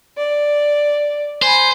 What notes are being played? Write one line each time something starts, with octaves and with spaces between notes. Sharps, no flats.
D5
C5 G#5 B5